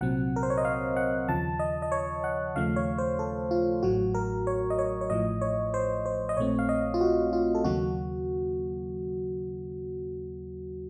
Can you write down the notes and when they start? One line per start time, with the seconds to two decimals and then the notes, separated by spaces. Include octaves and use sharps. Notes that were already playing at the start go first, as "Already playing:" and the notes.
0.01 C2 A#2 F#3 C4 F#5
0.36 A#4
0.43 C5
0.50 C#5
0.58 D#5
0.65 F5
0.97 F#5
1.28 D#2 C#3 F3 A5
1.59 D#5
1.82 D#5
1.92 C#5
2.24 F#5
2.56 D#2 C#3 F3 A3 F5
2.76 C#5
2.98 C5
3.19 A4
3.51 F4
3.83 A1 A2 F#3 F#4
4.14 A#4
4.47 C#5
4.70 D#5
4.79 C#5
5.01 C#5
5.10 A1 A2 F3 D#5
5.41 C#5
5.74 C5
6.06 C5
6.29 D#5
6.37 A#1 A#2 A3 C4 C#5
6.59 F5
6.69 D#5
6.94 F4
7.01 F#4
7.33 F4
7.55 A4
7.64 D#2 C#3 F#3 A#3 F#4